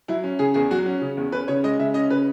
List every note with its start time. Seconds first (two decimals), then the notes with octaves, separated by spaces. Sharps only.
0.08 F#3 E4
0.24 C#4
0.39 C#3 G#4
0.54 E2 G#4
0.71 F#3 F#4
0.86 C#4
1.01 C#3
1.17 E2
1.32 C#4 B4
1.48 C#3 C#5
1.64 G#3 D#5
1.79 C#3 E5
1.94 C#4 D#5
2.10 C#3 B4